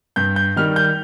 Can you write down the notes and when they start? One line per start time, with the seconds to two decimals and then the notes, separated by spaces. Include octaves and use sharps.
0.16 G2 G6
0.36 G6
0.56 D#3 G3 F6
0.76 G6